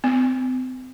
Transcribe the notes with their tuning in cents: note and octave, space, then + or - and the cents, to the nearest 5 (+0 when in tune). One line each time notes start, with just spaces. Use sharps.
C4 -35